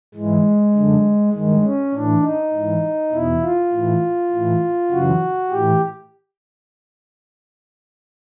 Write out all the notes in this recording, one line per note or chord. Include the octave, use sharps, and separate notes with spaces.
G#2 E3 G#3
F#2 D3
G2 D#3 G#3
C#4
A2 E3 D4
D#4
G#2 E3
E2 B2 E4
F4
A2 E3
A2 E3
F#2 C#3 E3 F#4
A2 E3 G4